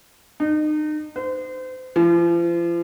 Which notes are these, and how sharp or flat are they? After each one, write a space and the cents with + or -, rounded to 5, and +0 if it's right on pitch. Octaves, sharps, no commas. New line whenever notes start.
D#4 -35
C5 -30
F3 -40